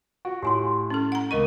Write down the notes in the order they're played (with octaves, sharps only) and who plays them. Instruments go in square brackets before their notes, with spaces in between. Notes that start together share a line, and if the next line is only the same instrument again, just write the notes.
[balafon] F4 [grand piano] F#4
[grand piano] A2 [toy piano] G4 G#5 C6
[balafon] C#4 A4
F#5 A#5
[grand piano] C#2 D#7 [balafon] A#4 D#5 C#6